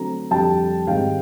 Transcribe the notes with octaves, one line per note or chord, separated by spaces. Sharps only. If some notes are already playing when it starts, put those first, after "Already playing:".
Already playing: D3 F#3 A3 C4 A#5
F2 D3 G3 G5 A5
G#2 D#3 G3 C4 F5 G5